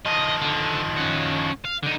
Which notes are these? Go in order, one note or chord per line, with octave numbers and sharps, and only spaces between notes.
D#3 F3 D#5
D3
C#4 F#5
F5
D3 D#4